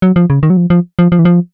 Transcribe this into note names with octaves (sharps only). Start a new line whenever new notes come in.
F#3
F3
C#3
D#3
F#3
F3
F3
F3
F3
E3
F3